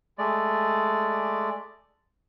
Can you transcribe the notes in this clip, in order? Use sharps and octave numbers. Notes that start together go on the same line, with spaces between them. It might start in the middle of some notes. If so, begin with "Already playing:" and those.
G#3 A3 D5